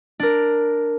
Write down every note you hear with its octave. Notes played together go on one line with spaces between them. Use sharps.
D4 A#4